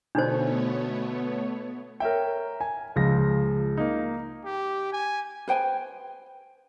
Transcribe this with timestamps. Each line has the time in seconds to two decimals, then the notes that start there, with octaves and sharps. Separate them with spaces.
0.15 B2 D3 A3 B3 D4 D#4 C5 C#5
2.00 A#4 C#5 E5 G5
2.61 G#5
2.96 C#2 F3 G#3 A#6
3.78 A#3 D#4
4.45 G4
4.92 G#5
5.48 B4 C5 G5 G#5